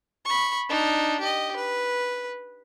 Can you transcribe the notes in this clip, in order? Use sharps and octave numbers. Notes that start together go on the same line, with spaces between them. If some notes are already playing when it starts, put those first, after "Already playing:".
B5 C#6
D4 D#4
G4 D#5
B4